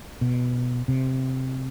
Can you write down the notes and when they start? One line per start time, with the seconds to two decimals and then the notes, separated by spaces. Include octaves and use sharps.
0.21 B2
0.88 C3